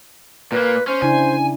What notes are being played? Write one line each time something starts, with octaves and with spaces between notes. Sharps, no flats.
A#2 A#3 B4
C#4 C5
C#3 D4 E4 G#5